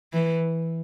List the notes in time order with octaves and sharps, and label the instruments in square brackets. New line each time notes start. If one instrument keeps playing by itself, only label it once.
[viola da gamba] E3